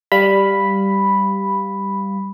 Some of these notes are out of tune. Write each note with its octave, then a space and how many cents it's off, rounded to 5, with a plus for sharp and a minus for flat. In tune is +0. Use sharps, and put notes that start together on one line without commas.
G3 +0 F5 +0 B5 +0